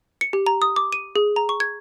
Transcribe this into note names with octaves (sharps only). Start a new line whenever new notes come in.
C#7
G4
A#5
D#6
D6
D#7
G#4
A#5
C#6
G#6